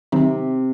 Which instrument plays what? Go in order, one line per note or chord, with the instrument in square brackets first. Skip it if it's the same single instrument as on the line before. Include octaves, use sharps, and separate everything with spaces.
[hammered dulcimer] C3 [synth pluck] D#3 F#3 C4 D#4